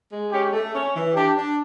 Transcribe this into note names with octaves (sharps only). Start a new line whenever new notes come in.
G#3
C#4 G4
A3
C#4
E3
D4 G4
D4